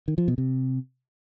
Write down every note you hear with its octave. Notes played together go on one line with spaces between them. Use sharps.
D#3
F3
B2
C3